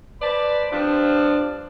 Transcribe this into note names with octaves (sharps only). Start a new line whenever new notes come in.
B4 C5 D5 A5 B5
G2 F3 C4 D4